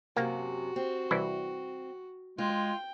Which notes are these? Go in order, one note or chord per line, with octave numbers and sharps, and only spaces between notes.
F#2 C3 A#3 F#4
C4
C2 E3 E4
G#3 F4 G5